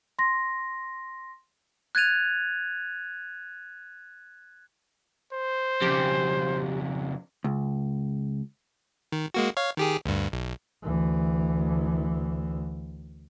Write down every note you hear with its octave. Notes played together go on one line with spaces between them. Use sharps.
C6 A#6
F#6 G#6 A6 D#7 F7
C5
F2 C#3 G4
C#2
D#3
G#3 A#3 F#4
C#5 F5
D#3 G4 G#4
D2 G2
B1
D2 E3